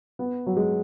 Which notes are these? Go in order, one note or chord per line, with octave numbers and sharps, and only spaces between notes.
B3
F#3
G#3